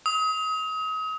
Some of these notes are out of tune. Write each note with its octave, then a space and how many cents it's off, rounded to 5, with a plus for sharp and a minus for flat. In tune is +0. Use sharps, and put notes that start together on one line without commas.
D#6 +35